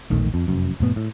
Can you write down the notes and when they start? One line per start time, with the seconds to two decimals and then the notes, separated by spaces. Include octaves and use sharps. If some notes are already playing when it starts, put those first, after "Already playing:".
0.10 E1 A#1 D#3 A3
0.34 F2
0.48 F1 F#2
0.80 F1 A2 B3
0.96 A2